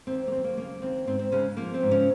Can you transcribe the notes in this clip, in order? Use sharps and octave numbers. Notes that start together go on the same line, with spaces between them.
D#2 C4
A#3
F#3 C4
A#3
C#3 A#3
D#2 C4
G#2 C4
C4
C#3 G#3 C#4
F3 A#3
C4
G#2
C#3 C#4